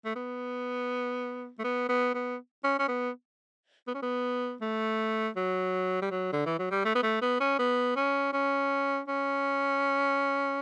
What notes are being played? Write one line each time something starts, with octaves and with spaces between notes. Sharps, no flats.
A3
B3
A3
B3
B3
B3
C#4
C#4
B3
B3
C#4
B3
A3
F#3
G3
F#3
D3
E3
F#3
G3
A3
B3
A3
B3
C#4
B3
C#4
C#4
C#4